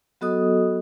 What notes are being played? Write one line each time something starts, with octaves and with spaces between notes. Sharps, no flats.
F#3 B3 F#4 A4 D#5 D#6